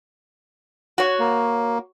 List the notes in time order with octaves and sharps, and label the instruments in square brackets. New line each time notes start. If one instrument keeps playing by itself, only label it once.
[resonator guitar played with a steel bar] F#4 C#5
[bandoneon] A#3